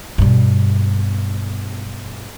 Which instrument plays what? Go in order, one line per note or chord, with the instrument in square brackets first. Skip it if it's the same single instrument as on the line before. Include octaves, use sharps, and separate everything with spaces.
[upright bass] G2 B2